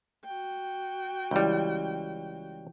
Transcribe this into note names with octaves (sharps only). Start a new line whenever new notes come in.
F#4 G5
C#2 E3 G3 E4